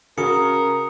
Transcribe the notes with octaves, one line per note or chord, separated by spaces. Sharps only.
C#3 F#4 A#4 D#6 C#7